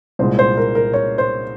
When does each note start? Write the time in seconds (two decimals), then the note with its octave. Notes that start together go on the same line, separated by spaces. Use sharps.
0.19 C2 A#2 G#3 C5
0.39 C5
0.57 A#4
0.75 A#4
0.93 C#5
1.18 C5